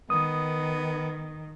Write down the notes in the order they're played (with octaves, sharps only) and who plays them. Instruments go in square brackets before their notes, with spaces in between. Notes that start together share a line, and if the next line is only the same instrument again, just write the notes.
[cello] D#3 [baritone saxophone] B3 [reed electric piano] D#6